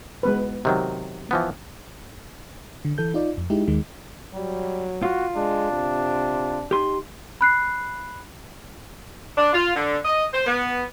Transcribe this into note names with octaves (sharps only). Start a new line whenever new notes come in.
G#3 B3 B4
C3 D#3 F#3
E3 F3 B3
D3
E3 A4 G6
D#4 F4 D5
F2
G#3 D#4 E4 G4
D#2 D#3 G#3
F#3 G3
F4 F#4
G#3 D4
C3
D#4 G4 C6
B5 F#6 C7
D4
F4
D3
D#5
C5
B3